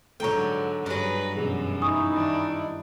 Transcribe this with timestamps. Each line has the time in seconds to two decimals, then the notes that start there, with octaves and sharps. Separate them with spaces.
0.20 G#2 D3 F#3 A4 C#5 G5 A#5
0.86 G2 F#3 G#4 B4
1.36 F#2 B2 E3 G#4
1.82 D#4 E4 G#5 C#6 D#6
2.11 D#3 D4